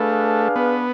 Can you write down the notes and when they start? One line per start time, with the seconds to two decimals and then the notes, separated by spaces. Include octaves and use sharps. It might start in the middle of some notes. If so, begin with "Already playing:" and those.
Already playing: A3 D4 G#4 B4 F5
0.56 B3